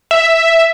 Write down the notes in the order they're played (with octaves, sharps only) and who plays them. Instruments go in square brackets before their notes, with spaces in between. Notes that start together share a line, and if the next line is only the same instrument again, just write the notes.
[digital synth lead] E5